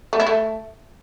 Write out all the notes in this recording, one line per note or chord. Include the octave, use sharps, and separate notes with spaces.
A3
E4
A3